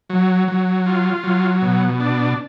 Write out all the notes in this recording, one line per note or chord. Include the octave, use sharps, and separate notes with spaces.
F#3
F#3
F4
F#3
B2
D4